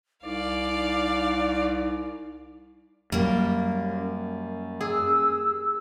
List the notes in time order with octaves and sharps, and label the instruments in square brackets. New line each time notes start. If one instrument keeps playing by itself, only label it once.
[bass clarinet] C2 [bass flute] D#4 [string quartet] D5 F5
[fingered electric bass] F#2 [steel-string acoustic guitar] G3 A#3
[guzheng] G#4 [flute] E6